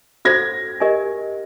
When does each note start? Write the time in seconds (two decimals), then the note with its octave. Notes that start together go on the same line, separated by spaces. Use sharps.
0.25 F#4 A4 C5 G#6 A#6
0.80 G4 A#4 D#5 G#5